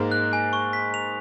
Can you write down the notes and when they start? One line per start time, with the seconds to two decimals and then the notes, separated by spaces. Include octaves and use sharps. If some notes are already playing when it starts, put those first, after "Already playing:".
Already playing: G#2 G#3 A#3
0.12 F#6
0.33 G#5
0.53 C#6
0.73 B6
0.94 F7